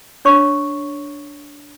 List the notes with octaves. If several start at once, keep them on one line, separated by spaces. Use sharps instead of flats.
D4 C#5 C#6